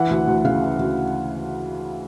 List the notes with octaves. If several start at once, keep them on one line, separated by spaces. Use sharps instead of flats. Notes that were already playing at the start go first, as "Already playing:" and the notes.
Already playing: E3 F#5
D2
D2
C#3 F5
E3
D2